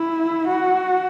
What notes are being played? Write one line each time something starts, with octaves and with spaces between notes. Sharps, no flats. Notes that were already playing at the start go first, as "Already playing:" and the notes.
Already playing: E4
F#4